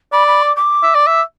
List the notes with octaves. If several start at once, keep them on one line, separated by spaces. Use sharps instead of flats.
D5 B5
B5
D6
D6
E5
D5
E5